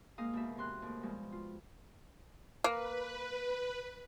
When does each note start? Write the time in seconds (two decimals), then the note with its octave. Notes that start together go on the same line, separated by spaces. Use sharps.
0.18 G#2 A#3 D#4 F5 D#6
0.33 D#2 B2 E5
0.57 E2 C3 C6 F#6
0.82 D#2 A2
1.03 B2 F3 G3 G#3
1.32 F4
2.64 A#3 B4